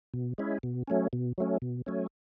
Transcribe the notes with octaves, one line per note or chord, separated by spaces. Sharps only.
B2
G#3 C#4 E4
B2
F#3 A3 C#4
B2
F#3 A3 C#4
B2
F#3 A3 C#4